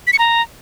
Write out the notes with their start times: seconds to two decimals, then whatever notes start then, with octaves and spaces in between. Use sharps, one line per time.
0.07 B6
0.13 C#7
0.19 A#5